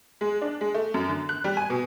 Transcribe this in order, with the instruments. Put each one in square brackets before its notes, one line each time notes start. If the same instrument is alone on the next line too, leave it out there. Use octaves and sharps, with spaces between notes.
[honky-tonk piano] G#3
D4
G#3
A3
F#2
D3
F#6
G3
G#5
B2